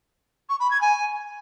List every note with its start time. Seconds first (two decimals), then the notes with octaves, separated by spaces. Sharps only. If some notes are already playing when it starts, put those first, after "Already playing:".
0.49 C#6
0.60 B5
0.70 G#6
0.81 G#5